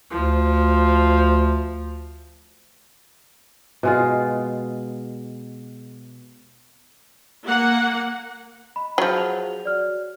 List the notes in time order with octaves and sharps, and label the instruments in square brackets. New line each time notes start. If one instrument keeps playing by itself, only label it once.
[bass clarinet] D2 [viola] F3
[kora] B2 G#3 F4
[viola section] A#3 F#5
[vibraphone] D#5 [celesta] B5
[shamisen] F3 F#3 [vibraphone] F#4 G#4 F#5
[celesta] F7
[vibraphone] F#4 C#5 [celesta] D5 F6